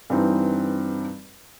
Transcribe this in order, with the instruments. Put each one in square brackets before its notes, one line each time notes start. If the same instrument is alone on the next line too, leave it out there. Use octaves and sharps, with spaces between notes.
[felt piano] G2 E3 C4 D#4